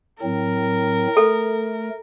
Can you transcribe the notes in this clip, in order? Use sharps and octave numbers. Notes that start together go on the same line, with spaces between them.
A2 F#3 C4 A#4
A3 A4